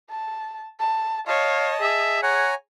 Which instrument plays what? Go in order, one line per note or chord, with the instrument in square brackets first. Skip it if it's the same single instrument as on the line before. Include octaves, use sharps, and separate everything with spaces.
[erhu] A5
A5
[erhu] C#5 [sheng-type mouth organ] D#5 A5 [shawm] F5
[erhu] G#4 [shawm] E5
[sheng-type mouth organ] C#5 G#5 A#5 [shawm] F#5